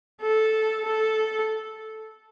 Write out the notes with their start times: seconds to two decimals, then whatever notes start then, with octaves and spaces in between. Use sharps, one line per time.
0.22 A4
0.85 A4